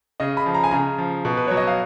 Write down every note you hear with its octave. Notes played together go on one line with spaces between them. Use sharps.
C#3 D#5
B5
F3
A#5
G#5
C#3 A#5
F3
B2
B4
F#3 C#5
D#5
F5